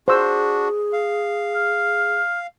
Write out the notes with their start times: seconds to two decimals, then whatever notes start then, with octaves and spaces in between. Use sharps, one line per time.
0.08 D4 F#4 G#4 C5 E6
0.93 F5
1.54 F6